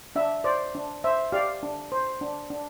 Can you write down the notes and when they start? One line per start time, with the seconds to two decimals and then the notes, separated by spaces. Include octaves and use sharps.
0.16 D4 E5
0.44 C5 D5
0.75 D4
1.04 C5 E5
1.32 G4 D5 F5
1.63 D4
1.92 C5
2.21 D4
2.50 D4